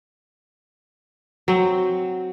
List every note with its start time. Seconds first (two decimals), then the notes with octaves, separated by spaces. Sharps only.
1.48 F#3 C4